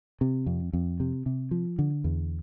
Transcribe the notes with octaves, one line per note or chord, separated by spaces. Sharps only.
C3
F2
F2
C3
C3
F3
D3
E2